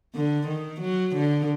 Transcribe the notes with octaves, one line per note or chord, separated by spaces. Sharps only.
D3
D#3
F#3
D3